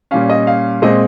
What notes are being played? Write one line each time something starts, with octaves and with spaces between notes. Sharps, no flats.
A#2 G3 C#4 F5
D#5
F5
A#2 G#3 C4 D#5